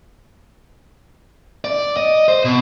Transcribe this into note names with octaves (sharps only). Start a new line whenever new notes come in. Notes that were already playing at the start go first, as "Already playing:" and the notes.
D5
D#5
C5
B2